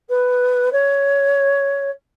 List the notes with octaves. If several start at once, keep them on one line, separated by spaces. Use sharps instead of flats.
B4
C#5